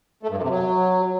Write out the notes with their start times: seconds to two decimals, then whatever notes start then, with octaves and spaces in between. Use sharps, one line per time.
0.23 A3
0.30 G2
0.36 F#2
0.43 C3
0.50 F#3